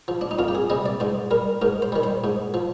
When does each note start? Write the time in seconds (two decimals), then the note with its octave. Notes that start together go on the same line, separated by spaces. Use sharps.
0.08 F3
0.21 D4
0.31 D#4
0.39 F2 F4
0.48 G4
0.55 G#4
0.70 C3 G3 D#5
0.86 D5
1.00 G#2 C5
1.31 G3 A#4
1.62 G#2 A#4
1.82 C5
1.92 D#3 G3
2.03 C5
2.24 G#2
2.54 F3